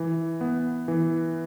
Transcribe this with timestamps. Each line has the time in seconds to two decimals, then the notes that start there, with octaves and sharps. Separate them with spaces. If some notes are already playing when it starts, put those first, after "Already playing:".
Already playing: E3
0.41 B3
0.88 E3